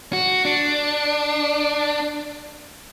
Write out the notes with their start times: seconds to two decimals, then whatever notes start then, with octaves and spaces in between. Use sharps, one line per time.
0.13 F#4
0.45 D4